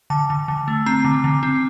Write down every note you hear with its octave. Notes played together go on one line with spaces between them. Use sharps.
D3 A5
D3
D3
A3
C4 A#5
D3
D3
C4